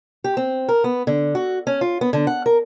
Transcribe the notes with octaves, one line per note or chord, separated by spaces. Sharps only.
G4
C4
A#4
B3
D3
F#4
C#4
F4
B3
D3
F#5
A#4